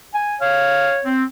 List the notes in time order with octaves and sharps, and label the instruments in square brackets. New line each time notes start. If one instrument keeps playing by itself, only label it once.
[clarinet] G#5
[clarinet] C#5 [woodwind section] F5
[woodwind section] C4